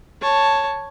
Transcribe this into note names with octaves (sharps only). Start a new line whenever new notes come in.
C#5 A5